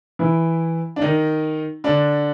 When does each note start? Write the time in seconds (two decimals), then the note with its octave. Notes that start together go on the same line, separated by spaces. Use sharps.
0.19 E3 E4
0.96 D4
1.02 D#3 D#4
1.84 D3 D4